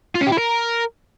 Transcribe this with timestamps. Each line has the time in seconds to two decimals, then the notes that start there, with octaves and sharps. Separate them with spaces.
0.15 F4
0.21 C#4
0.27 G4
0.32 E4
0.38 A#4